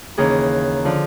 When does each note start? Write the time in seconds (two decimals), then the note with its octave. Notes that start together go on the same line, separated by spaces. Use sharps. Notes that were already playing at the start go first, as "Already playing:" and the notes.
0.17 D#2 C#3 E3 G#4
0.85 D3 F3